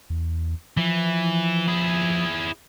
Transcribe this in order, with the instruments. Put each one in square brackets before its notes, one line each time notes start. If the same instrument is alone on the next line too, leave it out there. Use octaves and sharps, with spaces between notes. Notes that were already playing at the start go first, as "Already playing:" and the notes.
[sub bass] E2
[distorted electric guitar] E3 [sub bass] F3
[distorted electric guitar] E4 G#4